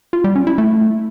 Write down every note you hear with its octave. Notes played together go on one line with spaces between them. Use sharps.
F4
G3
C#4
E4
A3